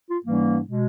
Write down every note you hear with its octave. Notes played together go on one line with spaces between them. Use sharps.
F4
G#2 E3 G3 A#3 C#4
B2 G#3